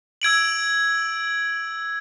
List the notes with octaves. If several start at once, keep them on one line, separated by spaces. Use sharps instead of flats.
E6 G#6 D7 F#7